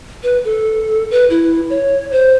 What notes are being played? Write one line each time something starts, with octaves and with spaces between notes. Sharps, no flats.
B4
A4
B4
E4
C#5
C5